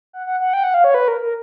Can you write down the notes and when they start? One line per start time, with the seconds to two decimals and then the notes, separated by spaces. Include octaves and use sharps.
0.13 F#5
0.27 F#5
0.40 F#5
0.53 G5
0.64 F#5
0.74 F5
0.84 C#5
0.94 B4
1.08 A#4
1.21 A#4